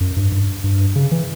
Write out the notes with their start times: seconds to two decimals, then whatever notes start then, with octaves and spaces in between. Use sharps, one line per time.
0.01 F#2
0.17 G2
0.32 G2
0.64 G2
0.96 C#3
1.11 E3